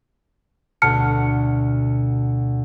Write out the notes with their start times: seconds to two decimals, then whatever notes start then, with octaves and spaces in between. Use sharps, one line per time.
0.82 D2 B2 A5 F6 C#7